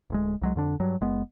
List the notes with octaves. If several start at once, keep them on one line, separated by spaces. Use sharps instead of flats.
D1 D2 G#3
C2 F#3 G#3
F2 D3 D4
G2 F#3
F#1 G#3 B3